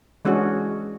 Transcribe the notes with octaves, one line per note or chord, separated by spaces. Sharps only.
E3 G#3 C#4 D4 F#4